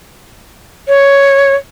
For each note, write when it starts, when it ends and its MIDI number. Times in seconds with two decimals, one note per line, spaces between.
0.88 1.55 73